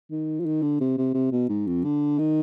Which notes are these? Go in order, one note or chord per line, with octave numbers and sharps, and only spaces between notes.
D#3
F3
D#3
D3
C3
C3
C3
B2
G#2
F2
D3
D#3